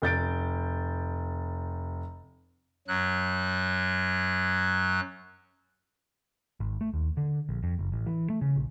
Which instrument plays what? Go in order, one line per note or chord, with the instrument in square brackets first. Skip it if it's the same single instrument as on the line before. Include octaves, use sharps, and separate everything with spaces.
[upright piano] F1 G6 A6 D7
[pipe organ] F#2 F#3 F#6
[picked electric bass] G#1
A3
D#2
D3
A#1
F2
F#1
A1
E3
A3
C#3
A#1